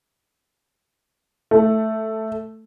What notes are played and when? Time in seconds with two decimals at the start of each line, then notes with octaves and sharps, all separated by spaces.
1.51 A3